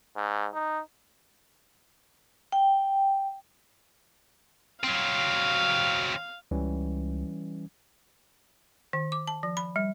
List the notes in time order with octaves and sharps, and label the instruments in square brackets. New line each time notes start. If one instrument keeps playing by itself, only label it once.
[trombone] G#2
D#4
[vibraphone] G5
[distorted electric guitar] F#3 C4 [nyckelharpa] F5
[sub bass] C#2 [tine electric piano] E3 G3 C#4
[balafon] D#3
D6
A5
F3
B5
G3